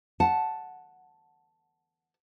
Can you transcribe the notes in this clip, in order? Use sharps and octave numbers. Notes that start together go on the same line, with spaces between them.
F#5 A5